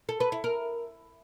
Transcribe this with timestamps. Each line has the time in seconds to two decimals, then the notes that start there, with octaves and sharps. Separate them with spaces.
0.09 A4
0.20 B4
0.32 E4
0.44 A#4